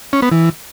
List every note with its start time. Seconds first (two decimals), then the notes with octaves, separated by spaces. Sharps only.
0.13 C#4
0.22 B3
0.32 E3